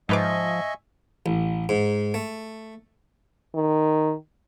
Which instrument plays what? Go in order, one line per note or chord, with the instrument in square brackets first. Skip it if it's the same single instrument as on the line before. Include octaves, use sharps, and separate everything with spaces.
[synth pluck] G#2 B4 D6 [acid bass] F3 [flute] D#5 [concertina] E5 G#5 C#6
[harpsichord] A1
G#2
A3
[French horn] D#3